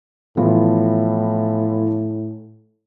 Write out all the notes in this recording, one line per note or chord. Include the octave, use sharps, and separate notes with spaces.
A2 E3 F3 B3